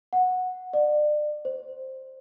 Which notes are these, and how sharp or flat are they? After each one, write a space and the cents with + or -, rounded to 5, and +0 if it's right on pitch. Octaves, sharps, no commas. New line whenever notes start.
F#5 -10
D5 +30
C5 +5